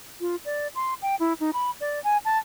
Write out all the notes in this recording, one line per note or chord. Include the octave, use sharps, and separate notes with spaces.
F4
D5
C6
G5
E4
D#4
B5
D5
G#5
A5